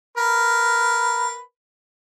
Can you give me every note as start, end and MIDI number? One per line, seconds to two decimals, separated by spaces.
0.17 1.40 70
0.17 1.40 71